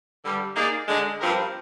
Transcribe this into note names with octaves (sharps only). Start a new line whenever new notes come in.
G2 D3 G3
A#3 D#4 G#4 D5
D3 G#3 D4 G#4 D#5
G2 F3 C4 G4 A#4